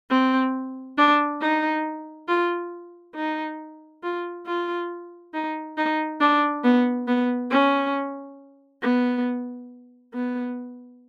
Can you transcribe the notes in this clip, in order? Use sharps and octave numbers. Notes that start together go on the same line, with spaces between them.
C4
D4
D#4
F4
D#4
F4
F4
D#4
D#4
D4
B3
B3
C#4
B3
B3